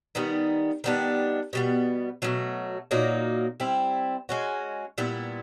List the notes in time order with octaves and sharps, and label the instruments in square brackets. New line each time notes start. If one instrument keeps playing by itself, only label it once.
[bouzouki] D#3 G3 B3 D#4
D#3 G3 B3 D4
B2 G3 B3
B2 F#3 A3
A#2 F#3 A#3 D#4
G3 C4 E4
G#3 C#4 F#4
A#2 G3 B3 E4